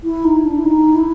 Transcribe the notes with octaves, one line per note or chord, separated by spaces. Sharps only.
E4
D#4
D4
E4
D#4
E4